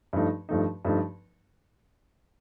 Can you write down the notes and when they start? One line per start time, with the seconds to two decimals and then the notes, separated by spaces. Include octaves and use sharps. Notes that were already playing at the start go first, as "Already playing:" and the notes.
0.13 G2 F3 A3 D#4
0.49 G2 F3 A3 D#4
0.85 G2 F3 A3 D#4